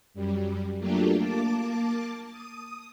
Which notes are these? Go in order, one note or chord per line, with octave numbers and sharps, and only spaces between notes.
F#2 G3
F#3 A3 A#3 D4 F4 G4
A#3 A5 D6
D#6